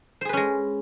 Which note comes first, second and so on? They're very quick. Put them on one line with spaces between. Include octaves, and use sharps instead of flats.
C5 G#4 B4 C#4 G#3